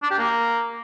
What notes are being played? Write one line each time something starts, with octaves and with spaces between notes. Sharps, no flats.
D4
G4
A#3